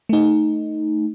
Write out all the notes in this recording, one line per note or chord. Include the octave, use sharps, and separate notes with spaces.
A3 D#4